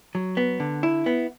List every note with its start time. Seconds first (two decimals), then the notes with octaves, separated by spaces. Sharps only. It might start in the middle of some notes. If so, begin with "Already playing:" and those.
0.15 F#3
0.37 B3
0.60 D3
0.83 E4
1.06 B3